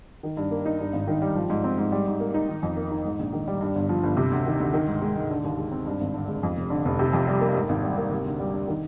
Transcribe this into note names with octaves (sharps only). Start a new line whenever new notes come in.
D#3
G2
A#3
D#4
G2
G#1
D#3
G3
F3
G#2
C4
G#2
G3
G#2
A#3
D#4
D#3
F2
A#3
D#4
G#2
A#1
D#3
G3
G2
G1
F3
G1
C3
D2
D#3
D2
D#3
G#2
G#3
G#2
D3
D#2
G#3
C4
G2
G#1
D3
G#3
F2
F1
D3
F1
C3
F2
G3
A#3
G#2
G#1
G3
A#3
C3
D2
G3
D4
D#3